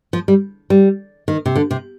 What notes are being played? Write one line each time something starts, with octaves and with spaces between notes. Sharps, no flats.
F3
G3
G3
D#3
C3
D3
C3